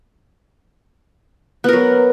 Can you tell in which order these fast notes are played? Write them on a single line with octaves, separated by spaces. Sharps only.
B3 A#4 F#3